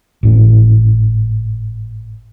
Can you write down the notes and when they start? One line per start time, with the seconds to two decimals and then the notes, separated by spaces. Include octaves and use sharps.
0.23 G#1 A2 C#4